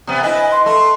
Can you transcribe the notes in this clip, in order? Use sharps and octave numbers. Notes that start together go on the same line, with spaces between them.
C3 B3
E4 B4 D#5 G#5
C6
A3 C6